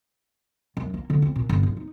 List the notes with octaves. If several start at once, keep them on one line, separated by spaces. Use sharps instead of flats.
F#2
A#3
D3
C4
A#2
G1
D3
D#4